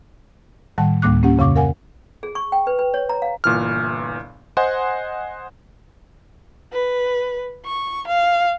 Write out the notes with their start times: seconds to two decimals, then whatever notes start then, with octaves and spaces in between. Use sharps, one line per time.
0.78 A2 D#3 G3 F#5 A5
1.02 D2 A2 G3 A#3 D6 F#6
1.23 A#3 C#4 G4 F#5
1.38 F2 C#3 F5 C#6 D6
1.56 A#4 F5 F#5 G#5
2.23 G#4
2.35 C#6
2.52 G5
2.67 B4
2.79 B4
2.94 C#5
3.09 A#5
3.22 F5
3.44 G1 A#2 E3 F6
4.57 C5 D#5 F#5 G#5 C6
6.73 B4
7.65 C#6
8.07 F5